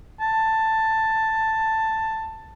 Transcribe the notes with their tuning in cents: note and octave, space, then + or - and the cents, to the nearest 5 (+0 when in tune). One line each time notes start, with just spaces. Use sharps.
A5 +10